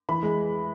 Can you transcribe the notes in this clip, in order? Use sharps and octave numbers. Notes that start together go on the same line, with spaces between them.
E3 B5
G#3